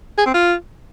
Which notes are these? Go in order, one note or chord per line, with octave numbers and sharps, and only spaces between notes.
G#4
C4
F4